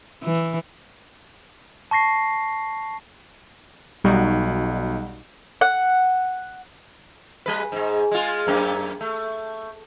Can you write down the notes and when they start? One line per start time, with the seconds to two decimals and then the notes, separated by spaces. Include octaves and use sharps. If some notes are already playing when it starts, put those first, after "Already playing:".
0.23 E3
1.91 A5 C#6 A#6 C7
4.04 B1 G3 D#4 F#4
5.61 F#5
7.46 G3 B4
7.72 G#2 G#3
8.12 G#3 F4
8.47 F#2 A#3
9.01 A3